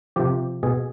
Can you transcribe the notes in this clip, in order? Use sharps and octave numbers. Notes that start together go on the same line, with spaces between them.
C3 F3 G4
B2 G#4